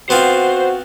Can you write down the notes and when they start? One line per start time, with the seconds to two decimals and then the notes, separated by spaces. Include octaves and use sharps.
0.10 B3 C4 F4 F#4 C5